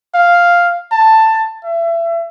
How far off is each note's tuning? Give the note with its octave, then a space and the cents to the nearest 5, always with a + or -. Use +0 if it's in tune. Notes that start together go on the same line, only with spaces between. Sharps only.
F5 +0
A5 +10
E5 +30